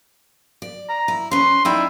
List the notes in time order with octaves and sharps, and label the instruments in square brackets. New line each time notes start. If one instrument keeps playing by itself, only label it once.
[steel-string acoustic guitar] D5
[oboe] A#5
[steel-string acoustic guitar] E4
[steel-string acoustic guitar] C#4 B4 [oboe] C6
[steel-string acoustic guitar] D#4 D5 G5 [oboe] E4